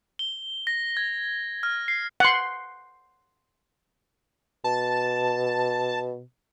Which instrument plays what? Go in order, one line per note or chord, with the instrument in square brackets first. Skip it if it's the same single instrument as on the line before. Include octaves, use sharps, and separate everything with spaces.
[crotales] G7
A#6
G#6
F6
C7
[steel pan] F#5 C6
[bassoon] B2 [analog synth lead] A5